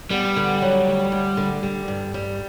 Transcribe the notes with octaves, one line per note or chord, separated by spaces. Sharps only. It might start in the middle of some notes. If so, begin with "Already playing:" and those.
G3 B3
D3
F#3
D2
D2
D3
G3
G2
G3